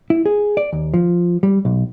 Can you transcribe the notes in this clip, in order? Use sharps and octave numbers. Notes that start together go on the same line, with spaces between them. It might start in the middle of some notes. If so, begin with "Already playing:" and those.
E4
G#4
D5
D#2
F3
G3
B1